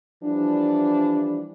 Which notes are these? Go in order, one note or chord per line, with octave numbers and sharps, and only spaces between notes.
E3 F3 G3 D4